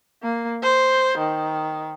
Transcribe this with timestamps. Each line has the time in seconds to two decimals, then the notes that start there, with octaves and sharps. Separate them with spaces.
0.23 A#3
0.62 C5
1.17 D#3